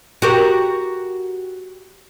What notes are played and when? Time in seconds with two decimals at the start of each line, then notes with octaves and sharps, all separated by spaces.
0.22 F#4 G4 A#4